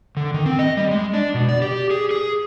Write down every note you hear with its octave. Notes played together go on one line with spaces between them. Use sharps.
D3
D#3
C4
D#5
G3
G#3
D4
B2
D5
G4
G#4
G#4